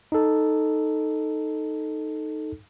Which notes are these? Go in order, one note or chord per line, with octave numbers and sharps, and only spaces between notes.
D#4 A4